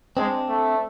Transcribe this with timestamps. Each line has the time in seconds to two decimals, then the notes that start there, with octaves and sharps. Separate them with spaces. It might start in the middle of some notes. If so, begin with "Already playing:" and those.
0.17 G#3 C4 D4
0.49 A3